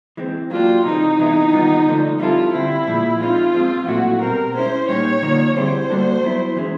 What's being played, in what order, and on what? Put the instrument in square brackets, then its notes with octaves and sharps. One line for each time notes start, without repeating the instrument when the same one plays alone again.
[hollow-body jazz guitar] E3 G#3 C4
[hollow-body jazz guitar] F#3 A#3 D4 G4 [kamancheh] F4
[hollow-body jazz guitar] C3 E3 G#3 C4 [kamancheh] D#4
[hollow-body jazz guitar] C3 E3 G#3 B3 E4
D#3 G3 B3 D4 F4
D3 F3 A3 D4
[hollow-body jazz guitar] G3 C4 E4 A4 [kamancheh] F4
[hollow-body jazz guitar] D3 G3 C4 [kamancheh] E4
[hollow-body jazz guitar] A#2 F3 G#3
[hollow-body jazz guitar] G#3 C4 D#4 [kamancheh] F4
[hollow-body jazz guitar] F3 G#3 C4
[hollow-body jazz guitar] A#2 F#3 A3 C4 E4 [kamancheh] F#4
[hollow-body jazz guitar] B2 G3 C4 [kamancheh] A#4
[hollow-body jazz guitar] G#3 C#4 E4 [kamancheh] C5
[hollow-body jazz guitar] A#2 G3 A#3 D#4 G4 [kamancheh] C#5
[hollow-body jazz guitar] D3 F3 A#3 D#4
[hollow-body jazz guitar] D3 G3 C4 E4 G#4 [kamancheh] C5
[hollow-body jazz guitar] G3 A#3 D4 F#4 A4
F#3 B3 E4
E3 G#3 C#4 E4 G#4